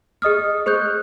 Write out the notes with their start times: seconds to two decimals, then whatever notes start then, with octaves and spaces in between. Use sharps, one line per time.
0.22 G#4 D#5 D#6 F6
0.66 G#4 C5 C#6 F#6 G6